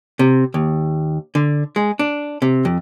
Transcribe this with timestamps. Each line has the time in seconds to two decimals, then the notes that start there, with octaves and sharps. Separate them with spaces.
0.19 C3
0.54 D#2
1.35 D3
1.76 G#3
1.99 D4
2.42 C3
2.65 F2